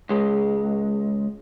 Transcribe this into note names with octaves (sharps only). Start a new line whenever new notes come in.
C#2 G#3